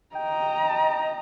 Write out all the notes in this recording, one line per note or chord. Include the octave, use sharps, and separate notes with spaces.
D#5 G5 A#5